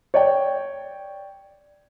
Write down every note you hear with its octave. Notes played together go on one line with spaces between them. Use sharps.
C#5 D5 G5